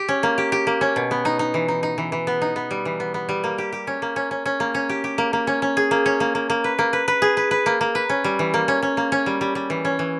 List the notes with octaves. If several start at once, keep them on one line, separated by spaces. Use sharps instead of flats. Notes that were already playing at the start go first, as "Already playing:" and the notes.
Already playing: G4
C#4
A#3
G4
G4
A#3
C#4
B2
B3
D#4
D#4
E3
D#4
D#4
E3
E3
B3
D#4
B3
G3
E3
B3
B3
G3
A#3
G4
G4
C#4
A#3
C#4
C#4
C#4
A#3
C#4
G4
G4
A#3
A#3
C#4
C#4
G#4
A#3
C#4
A#3
A#3
A#3
B4
A#3
B4
B4
G#4
B4
B4
A#3
A#3
B4
C#4
G3
E3
A#3
C#4
C#4
A#3
C#4
G3
G3
G3
E3
C#4
E3